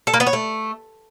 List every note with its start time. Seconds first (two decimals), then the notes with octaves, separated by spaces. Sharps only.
0.07 A4
0.14 A#3
0.20 B3
0.27 C#5
0.33 A3